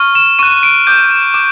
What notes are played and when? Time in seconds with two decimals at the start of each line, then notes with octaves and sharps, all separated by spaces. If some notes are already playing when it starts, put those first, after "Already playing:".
Already playing: C#6 F6
0.15 E7
0.39 C#6 F#6 D#7
0.63 D7
0.87 D6 G6
1.34 D6